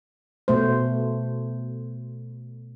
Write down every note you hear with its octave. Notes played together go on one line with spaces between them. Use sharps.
B2 A3 C5